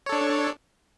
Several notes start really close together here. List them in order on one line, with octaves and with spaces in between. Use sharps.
C#5 A4 D4